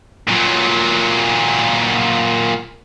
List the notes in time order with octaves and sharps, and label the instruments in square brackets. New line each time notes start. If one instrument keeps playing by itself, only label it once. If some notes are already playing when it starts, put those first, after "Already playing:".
[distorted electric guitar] A#2 F#3